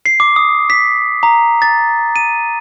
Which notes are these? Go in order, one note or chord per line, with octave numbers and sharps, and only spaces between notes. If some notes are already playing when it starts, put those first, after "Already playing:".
C7
D6
D#6
B6
A#5
A6
D#7